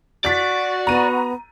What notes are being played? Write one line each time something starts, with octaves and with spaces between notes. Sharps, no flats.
F#4 D5 A6 B6
B3 A#5 D#7